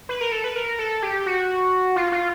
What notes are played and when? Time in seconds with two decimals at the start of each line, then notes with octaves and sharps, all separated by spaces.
0.09 B4
0.21 A#4
0.32 A4
0.44 B4
0.56 A#4
0.79 A4
1.03 G4
1.26 F#4
1.96 F4
2.12 F4